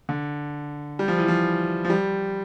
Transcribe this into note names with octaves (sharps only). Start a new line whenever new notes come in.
D3
G3
F3
E3
F3
F3
G3